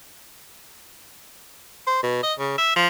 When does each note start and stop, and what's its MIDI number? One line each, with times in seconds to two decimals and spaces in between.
1.87 2.00 72
2.03 2.19 47
2.23 2.33 75
2.39 2.56 49
2.58 2.72 76
2.76 2.88 53